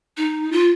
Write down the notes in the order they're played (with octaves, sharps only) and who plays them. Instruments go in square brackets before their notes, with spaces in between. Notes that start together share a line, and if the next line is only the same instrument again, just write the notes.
[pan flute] D#4
F4